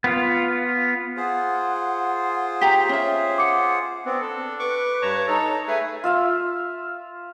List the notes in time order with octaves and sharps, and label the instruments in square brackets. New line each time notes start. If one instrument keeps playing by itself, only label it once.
[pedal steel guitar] B3 F4
[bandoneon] F4 G#4 C5 [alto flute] F#5
[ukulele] G4 A#5 [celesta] B6
[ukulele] C#4 E5 [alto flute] C#5
[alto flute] F#5 [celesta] D6 C#7
[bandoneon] B3 C4 [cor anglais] D4
[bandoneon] A4
[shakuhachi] B4 [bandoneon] C#6 D6
[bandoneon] G2 A5 A#5 [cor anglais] C#5
[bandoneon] D#4 C#5 [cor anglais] A4 [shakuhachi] A#5
[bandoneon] A3 B4 [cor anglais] G#4 [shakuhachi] E5
[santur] F4 E5 F5